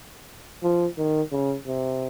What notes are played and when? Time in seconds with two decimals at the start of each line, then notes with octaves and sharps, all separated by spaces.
0.63 F3
0.98 D#3
1.32 C#3
1.67 C3